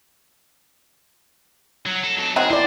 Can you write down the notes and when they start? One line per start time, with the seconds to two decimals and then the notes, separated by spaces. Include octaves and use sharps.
1.86 F#3
2.04 A4
2.17 F#3 A4
2.36 D#3 F#3 C4 G#4
2.50 E4 C5 D5